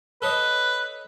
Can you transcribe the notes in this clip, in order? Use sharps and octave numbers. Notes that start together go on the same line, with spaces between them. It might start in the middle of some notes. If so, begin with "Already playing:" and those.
A4 B4 C#5 D#5